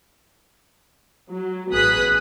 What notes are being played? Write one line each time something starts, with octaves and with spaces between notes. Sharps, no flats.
F#3
A1 B3 G#4 D#6 F#6 B6